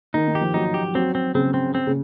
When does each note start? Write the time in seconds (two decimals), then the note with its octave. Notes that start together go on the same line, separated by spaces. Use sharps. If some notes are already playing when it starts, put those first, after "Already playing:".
0.14 D#3 D#4
0.28 D#3
0.35 G4
0.41 F3
0.54 F#3 D#4
0.74 G4
0.95 F#3 C4
1.15 C4
1.35 C#3 C4
1.54 C4
1.75 C4
1.87 C#3